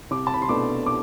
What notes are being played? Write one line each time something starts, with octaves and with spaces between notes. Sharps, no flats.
C2 D6
A5
B5
C6
B2 A3 D4 D6
D6